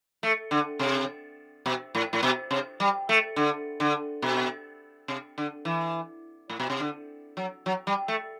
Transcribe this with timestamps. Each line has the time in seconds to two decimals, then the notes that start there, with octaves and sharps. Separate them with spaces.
0.23 A3
0.51 D3
0.79 C3
1.66 B2
1.95 A2
2.13 A2
2.23 B2
2.51 C3
2.80 G3
3.09 A3
3.36 D3
3.80 D3
4.22 B2
5.08 C3
5.38 D3
5.65 E3
6.50 A2
6.60 B2
6.70 C3
6.80 D3
7.37 F#3
7.66 F#3
7.87 G3
8.08 A3